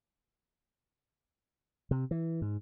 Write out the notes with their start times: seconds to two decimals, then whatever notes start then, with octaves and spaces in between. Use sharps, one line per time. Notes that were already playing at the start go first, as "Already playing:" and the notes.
1.91 C3
2.11 E3
2.42 G#2